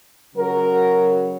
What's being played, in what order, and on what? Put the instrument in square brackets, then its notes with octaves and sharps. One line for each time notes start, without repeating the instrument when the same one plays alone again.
[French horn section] C#3 F#3 F#4 A#4